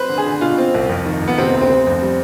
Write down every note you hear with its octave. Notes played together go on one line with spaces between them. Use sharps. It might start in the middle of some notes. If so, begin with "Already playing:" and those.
Already playing: C4 B4 C5
D3
G#4
D3
B2 F4
C4
C2
F2
D#3
F1
B3
C3 C4
D2
C4
D2
F2
G3